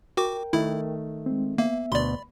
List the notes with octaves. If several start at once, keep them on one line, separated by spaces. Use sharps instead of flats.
F#4 A#4 G5 D6
D#3 A3 E4
G#3 C4
A#3 B3 E5
D2 B2 D5 B5 C6